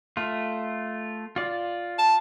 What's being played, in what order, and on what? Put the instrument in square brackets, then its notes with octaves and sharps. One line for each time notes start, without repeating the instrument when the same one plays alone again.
[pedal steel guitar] A3 F4
F4 D5
[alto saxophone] A5